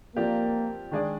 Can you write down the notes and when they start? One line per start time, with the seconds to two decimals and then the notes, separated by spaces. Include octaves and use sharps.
0.16 F3 A#3 C4 G4 D5
0.91 D#3 G#3 D4 G#4 D5